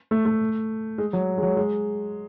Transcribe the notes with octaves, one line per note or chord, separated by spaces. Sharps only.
A3
A3
G#3
F#3
G#3
F#3
G#3